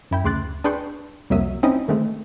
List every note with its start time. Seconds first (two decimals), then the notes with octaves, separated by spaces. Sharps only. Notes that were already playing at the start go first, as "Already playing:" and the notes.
0.11 F#2 E4 G5
0.24 D2 C#3 C6 D6 F#6 A6
0.64 D4 G#4 B4 G5 C6 C#6
1.30 C2 F2 F#3 A#3 E5 D#6
1.63 C4 C#4 D#4 E4 D#5
1.88 D3 D#3 G#3 A3 C4